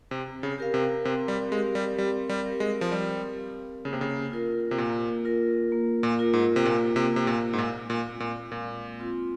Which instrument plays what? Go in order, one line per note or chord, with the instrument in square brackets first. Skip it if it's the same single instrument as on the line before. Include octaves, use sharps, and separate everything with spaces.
[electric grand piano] C3 [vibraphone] C4
[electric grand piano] C#3
[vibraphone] G4 A#4 F5
[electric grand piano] C3
[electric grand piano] C3 [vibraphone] C4
[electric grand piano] G3
[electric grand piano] G#3 [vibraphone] G4 A#4 F5
[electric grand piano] G3
[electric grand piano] G3 [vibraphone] C4
[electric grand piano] G3
[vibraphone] G4 A#4 F5
[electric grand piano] G#3
F3
[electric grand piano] G3 [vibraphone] C4
[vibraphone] G4 A#4 F5
[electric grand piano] C#3 [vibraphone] A#3
[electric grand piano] C3
C#3
[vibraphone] F4 A#4
[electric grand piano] C3
[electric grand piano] A#2 [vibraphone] A#3
[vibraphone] F4 A#4
A#3
[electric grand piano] A#2
[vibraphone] F4 A#4
[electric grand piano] G#2
C3
[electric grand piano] A#2 [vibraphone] A#3
[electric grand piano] C3
[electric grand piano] C3 [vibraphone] F4 A#4
[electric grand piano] A#2
G#2
[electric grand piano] A#2 [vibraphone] G#3
[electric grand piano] A#2
[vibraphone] C4 F4
[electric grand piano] A#2
[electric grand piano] A#2 [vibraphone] G#3
[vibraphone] C4 F4